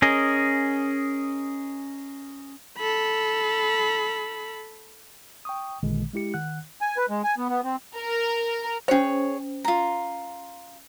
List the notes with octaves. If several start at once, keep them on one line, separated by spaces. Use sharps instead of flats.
C#4 G#4 A#4 D#5
A4 B5
G5 C#6 D#6
A1 A#2 D3 D#3 G#3
G#3 E4 G4 C#7
D#3 F#5 F#6
G#5
B4
G#3
G#5
B3
B3
C4
A#4
C#4 G#4 C5 C#5
F4 A#5